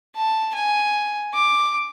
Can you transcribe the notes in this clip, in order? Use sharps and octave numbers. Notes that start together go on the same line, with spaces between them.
A5
G#5
D6